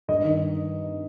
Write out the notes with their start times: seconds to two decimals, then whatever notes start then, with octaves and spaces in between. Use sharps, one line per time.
0.08 G2 D#5
0.23 D#3